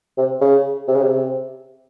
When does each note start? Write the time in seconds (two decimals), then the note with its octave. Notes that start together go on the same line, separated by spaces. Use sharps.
0.18 C3
0.41 C#3
0.88 C3
0.95 C#3
1.03 C3